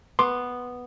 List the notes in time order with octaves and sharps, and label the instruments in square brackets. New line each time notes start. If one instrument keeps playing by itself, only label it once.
[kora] B3 [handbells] C6 D6